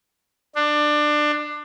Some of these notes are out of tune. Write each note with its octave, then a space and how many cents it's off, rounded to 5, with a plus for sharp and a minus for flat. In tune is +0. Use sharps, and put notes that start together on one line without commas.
D4 +20